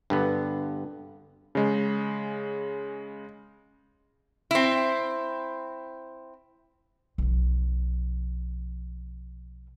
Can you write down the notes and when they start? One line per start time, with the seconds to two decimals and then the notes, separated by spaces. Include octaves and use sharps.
0.10 G2 D3 B3
1.55 C#3 G#3
4.51 C4 E4
7.18 B1 F3